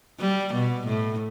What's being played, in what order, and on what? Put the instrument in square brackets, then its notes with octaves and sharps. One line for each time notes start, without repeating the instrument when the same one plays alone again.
[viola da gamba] G3
B2
A2